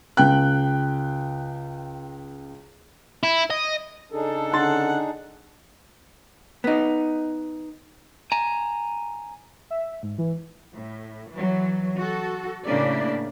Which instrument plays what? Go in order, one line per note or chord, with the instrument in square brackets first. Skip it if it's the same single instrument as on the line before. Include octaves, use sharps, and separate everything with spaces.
[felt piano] C#2 G5 F#6
[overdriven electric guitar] E4
D#5
[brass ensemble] C#3 A4 [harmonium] D4 D#4 G#4
[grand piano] D3 C6 A6 [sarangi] F#5
[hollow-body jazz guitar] B3 D#4
[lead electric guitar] G#5 A#5
[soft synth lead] E5
G#2
E3
[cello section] A2
E3 F#3
F#4 A4
A2 C#3 A#3 D4 E4 D5